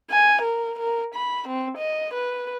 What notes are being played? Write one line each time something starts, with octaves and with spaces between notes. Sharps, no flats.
G#5
A#4
A#4
B5
C4
D#5
B4